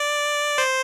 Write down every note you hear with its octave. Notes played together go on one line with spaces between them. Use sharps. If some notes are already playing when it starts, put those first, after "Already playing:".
Already playing: D5
C5